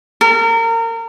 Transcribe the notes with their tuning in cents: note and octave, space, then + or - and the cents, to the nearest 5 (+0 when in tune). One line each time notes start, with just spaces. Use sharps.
A#4 -30